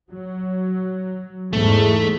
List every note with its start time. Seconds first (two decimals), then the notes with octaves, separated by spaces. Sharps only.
0.12 F#3
1.53 E2 G#2 A3